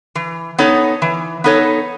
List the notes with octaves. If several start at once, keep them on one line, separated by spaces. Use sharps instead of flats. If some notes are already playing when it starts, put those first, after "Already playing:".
E3
B3 D#4 A4 C#5
E3
B3 D#4 A4 C#5